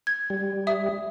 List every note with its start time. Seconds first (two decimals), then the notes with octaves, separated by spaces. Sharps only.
0.07 G#6
0.30 G3
0.67 E5 D#6